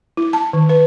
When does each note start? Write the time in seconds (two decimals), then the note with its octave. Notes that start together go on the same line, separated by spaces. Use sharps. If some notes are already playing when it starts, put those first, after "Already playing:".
0.17 E4
0.33 A5
0.53 D#3
0.69 B4